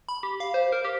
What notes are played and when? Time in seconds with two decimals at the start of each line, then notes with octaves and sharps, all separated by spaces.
0.09 B5
0.23 G4
0.40 F5
0.54 C5
0.72 A#4
0.85 G4